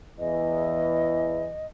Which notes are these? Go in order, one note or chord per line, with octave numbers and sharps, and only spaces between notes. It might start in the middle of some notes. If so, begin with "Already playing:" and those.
E2 E3 D#5